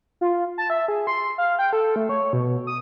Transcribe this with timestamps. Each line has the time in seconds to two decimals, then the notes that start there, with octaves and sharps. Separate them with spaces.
0.21 F4
0.58 A5
0.70 E5
0.88 G#4
1.07 C6
1.38 F5
1.59 G5
1.73 A4
1.96 A3
2.09 C#5
2.33 B2
2.67 D#6